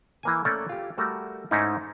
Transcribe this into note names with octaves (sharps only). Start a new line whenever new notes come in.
E3 A#3 G#5
A3 A#3 C#4 A4 D5
F4 G4
G3 A3 F#4 A#4
G#2 A3 C#4 D#4 E4